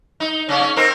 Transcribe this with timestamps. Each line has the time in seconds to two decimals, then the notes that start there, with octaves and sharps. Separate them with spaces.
0.20 D#4
0.49 C#3 C#4
0.61 C#4
0.76 C4 D#4 A#4